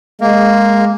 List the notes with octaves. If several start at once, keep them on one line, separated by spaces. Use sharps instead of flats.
G#3 A#3